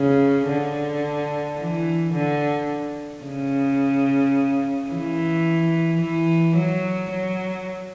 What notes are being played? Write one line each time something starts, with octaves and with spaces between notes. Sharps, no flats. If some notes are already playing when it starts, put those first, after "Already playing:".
Already playing: C#3
D3
E3
D3
C#3
E3
E3
F#3
F#3